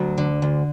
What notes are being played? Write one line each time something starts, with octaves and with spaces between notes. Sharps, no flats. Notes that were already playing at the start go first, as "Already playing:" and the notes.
Already playing: D2 F#3
D3
D2